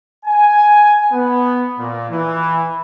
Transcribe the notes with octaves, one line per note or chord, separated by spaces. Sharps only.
G#5
B3
A#2
E3